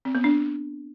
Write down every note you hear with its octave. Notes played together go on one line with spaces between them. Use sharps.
C4
B3
D4